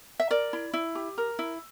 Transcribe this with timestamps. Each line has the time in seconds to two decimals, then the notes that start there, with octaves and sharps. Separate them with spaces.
0.20 E5
0.30 A#4 D5
0.53 E4
0.74 E4
0.95 G4
1.18 A#4
1.39 E4